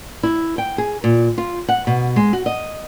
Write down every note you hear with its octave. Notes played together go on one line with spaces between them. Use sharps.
E4
G5
G#4
A#2
F4
F#5
B2
G#3
F#4
D#5